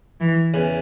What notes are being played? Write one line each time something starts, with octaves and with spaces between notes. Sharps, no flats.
E3
E2 C#3 E3